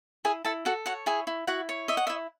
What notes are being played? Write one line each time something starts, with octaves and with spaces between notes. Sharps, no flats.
E4 G#4 G#5
E4 A4 A5
F#4 A4 F#5
F#4 C#5 F#5
E4 G#4 G#5
E4
E4 F#4 F#5
C#5
D#5 E5
F#5
E5
E4